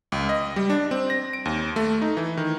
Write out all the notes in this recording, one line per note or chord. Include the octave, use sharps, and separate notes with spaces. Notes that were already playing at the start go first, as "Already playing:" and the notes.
C#2
D#5
G3
D4
C4
A#6
D7
D#2
A3
D#4
E3
D#3